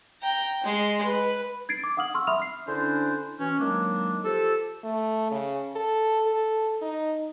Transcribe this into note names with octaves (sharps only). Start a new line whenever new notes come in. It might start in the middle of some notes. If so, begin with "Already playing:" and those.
G5 A#5
G#3 C6
B4
G#6 A6 C7 D7
D6
F5 F#5 D#6 F6 F#7
C6 C#6 E6 F6
E5 B5 D#6 F6 F7
F6 C7
D3 C#4 D4 E4 C5
B2 E3 C#4
D#3 F#3 G#3 A#3 D4
F3 G4 A4
A3
C#3
A4
A4
D#4